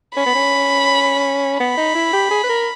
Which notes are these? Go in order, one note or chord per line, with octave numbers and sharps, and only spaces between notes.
C#4 B5
B3
C#4
B3 B5
D#4
E4
G4
G#4
B4
A#4